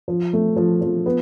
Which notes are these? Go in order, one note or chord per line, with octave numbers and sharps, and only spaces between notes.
F3
A3
F3
F3
B3